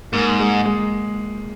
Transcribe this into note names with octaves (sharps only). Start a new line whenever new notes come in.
G#2 A#3
G#3
G#3